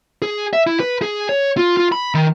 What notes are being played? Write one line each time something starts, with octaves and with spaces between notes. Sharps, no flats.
G#4
E5
E4
B4
G#4
C#5
F4
F4
B5
D#3